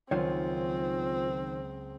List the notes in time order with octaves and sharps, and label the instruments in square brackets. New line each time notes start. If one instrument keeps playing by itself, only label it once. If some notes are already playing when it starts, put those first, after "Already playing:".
[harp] C#2 F#3 C#4 [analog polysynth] D#3 C5 [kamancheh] C4 [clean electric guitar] F4 C#5